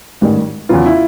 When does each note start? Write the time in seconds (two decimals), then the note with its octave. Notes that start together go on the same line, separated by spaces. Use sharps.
0.21 A1 G#2 D#3 G3
0.69 E2 C#3 F#3 B3 F4
0.86 E4